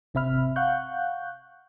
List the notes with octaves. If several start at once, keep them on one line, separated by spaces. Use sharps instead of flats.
G#1 C3 C4 E5 B5 F6
F5 F#5 C#6 F#6 G6